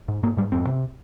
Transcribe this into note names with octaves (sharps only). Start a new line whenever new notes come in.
G#2
G#2 A#3
G#2 G3
F2 C4
C3